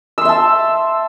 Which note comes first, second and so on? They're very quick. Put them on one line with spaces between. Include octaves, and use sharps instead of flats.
E6 C6 E5 A5